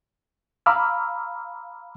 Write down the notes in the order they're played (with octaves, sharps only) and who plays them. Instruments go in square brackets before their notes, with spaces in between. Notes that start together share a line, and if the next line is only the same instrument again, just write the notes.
[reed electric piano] F5 A#5 B5 D6 E6 F6